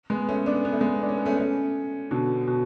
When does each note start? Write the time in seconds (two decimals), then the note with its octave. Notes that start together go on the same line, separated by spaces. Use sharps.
0.10 G#3 B3
0.29 A3 C#4
0.46 B3 D4
0.65 B3
0.72 A3
0.81 G#3 B3
1.02 D4
1.09 C#4
1.18 B3
1.26 A3 C#4
1.38 A3 C#4
2.11 B2 D3
2.48 B2